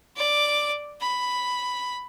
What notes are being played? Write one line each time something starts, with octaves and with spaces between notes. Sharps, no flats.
D5 D6
B5